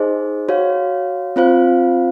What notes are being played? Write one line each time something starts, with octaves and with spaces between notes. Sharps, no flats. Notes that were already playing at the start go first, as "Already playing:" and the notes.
Already playing: D#4 G#4 C5 D#5
F#4 C#5 F5
C4 F4 C5 F5